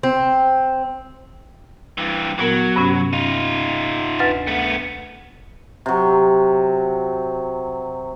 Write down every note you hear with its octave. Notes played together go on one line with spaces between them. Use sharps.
C4
G2 E3
A#2 F#3 B3 A#4
G2 C3 C#4
D#4 F4
D2 B4 A6
A3 B3
C3 F#3